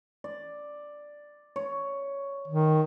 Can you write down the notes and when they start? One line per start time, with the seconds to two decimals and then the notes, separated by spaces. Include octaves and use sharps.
0.24 D5
1.56 C#5
2.48 D#3